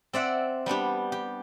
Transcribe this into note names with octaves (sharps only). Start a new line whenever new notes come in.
C4 D5 E5 F#5
G3 B3 D4 G4
G4